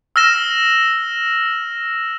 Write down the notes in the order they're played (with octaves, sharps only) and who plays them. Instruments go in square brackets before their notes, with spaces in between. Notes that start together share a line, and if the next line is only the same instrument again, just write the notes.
[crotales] E6 F6 A#6 E7